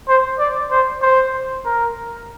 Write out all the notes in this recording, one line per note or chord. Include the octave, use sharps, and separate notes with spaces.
C5
D5
C5
C5
A#4